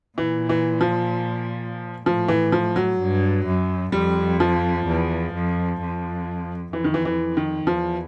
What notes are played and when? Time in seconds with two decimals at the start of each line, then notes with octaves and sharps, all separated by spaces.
0.18 A#2 E3
0.49 E3
0.81 F3
2.06 A2 F3
2.28 E3
2.52 F3
2.76 F#3
3.00 G2
3.46 F#2
3.92 F2 G3
4.40 F3
4.87 E2
5.34 F2
5.81 F2
6.73 F2 E3
6.84 D#3
6.94 E3
7.05 E3
7.37 D#3
7.67 E2 F3